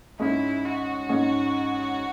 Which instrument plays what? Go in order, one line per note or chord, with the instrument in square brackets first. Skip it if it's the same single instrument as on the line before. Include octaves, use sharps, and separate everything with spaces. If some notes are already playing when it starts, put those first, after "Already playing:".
[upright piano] G#2 G#3 C#4 [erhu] E4
[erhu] F#4
[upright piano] G#2 G#3 C#4